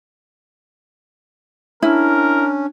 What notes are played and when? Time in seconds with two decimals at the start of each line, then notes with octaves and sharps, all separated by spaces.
1.82 C#4 D4 E4 A#4